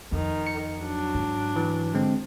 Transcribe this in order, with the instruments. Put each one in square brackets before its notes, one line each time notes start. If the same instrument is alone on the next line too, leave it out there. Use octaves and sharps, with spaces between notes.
[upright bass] F2 [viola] D#3
[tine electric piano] C#7
[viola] F#3 D4
[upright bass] G#2
[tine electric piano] E3
D3 G#3 C4